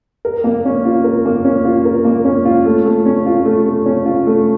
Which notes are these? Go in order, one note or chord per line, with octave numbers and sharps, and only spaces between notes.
A#4
A#3
C#4
F4
A#4
A#3
C#4
F4
A#4
A#3
C#4
F4
A3
A3
C#4
F4
A3
A3
C#4
F4
A3